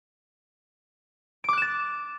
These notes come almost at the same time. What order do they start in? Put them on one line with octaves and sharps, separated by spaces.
D7 D6 F#6 E7 A6